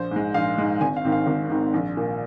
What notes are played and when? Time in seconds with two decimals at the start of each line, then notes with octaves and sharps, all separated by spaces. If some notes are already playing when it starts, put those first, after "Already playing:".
Already playing: A#1 C5
0.11 G#2 G#3
0.34 A#1 F5
0.58 G#2 G#3
0.81 G#1 G#5
0.96 F5
1.05 G#2 D#3 C4
1.12 F5
1.27 G#1
1.50 G#2 D#3 C4
1.74 A#1
1.97 A#2 A#3